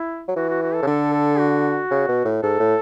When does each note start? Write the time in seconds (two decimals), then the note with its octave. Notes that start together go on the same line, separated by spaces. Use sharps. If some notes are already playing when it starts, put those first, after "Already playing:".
Already playing: E4
0.28 F#3
0.36 E3 F#4
0.49 F#4
0.62 F#4
0.74 A4
0.82 C#3
0.87 D3 A4
1.13 A4
1.39 F#4
1.91 C#3
2.08 B2
2.25 A2
2.43 G#2 A4
2.60 A2